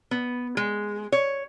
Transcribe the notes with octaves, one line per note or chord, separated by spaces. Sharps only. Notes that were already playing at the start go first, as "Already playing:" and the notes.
B3
G#3
C#5